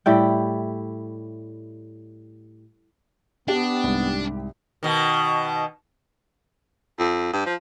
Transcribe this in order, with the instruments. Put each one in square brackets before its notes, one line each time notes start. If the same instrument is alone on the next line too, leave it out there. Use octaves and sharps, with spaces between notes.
[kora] A2 G3 E4 G5
[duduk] B3 [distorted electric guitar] D4 [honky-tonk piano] G4
[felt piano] C2 G#2
[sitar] B2 D#3
[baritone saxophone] F2
G2
F3